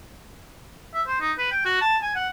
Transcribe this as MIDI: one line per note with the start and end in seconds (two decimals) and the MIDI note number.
0.94 1.02 76
1.07 1.19 72
1.21 1.32 63
1.38 1.52 71
1.52 1.61 79
1.65 1.78 66
1.81 1.97 81
2.03 2.12 80
2.15 2.29 78